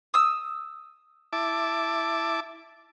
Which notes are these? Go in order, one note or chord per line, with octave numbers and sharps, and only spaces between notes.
D#6 E6
E4 A5 D6